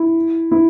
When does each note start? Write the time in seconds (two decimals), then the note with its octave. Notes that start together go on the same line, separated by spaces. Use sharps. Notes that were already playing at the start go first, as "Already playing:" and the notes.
Already playing: E4
0.52 E4